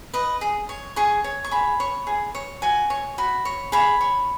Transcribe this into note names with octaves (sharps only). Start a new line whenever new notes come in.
B4 D#5
G#4
C#5
G#4 C#6
C#5
C#6
G#4 B5
C#5
G#4
C#5
F#4 G#5
C#5
F#4 B5
C#5
G#4 B5
C#5